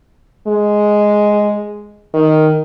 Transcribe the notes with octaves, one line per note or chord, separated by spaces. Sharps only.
G#3
D#3